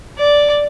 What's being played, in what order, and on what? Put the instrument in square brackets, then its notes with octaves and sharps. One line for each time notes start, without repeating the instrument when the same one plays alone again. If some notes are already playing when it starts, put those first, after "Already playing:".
[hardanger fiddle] D5